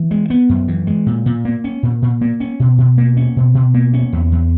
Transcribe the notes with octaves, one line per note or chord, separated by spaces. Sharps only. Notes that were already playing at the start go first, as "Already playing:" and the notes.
Already playing: E3
G#3
B3
F#2
E3
G#3
A#2
A#2
A#3
C#4
A#2
A#2
A#3
C#4
B2
B2
A#3
C#4
B2
B2
A#3
C#4
E2
E2